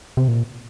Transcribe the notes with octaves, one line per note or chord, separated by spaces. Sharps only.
C3
A#2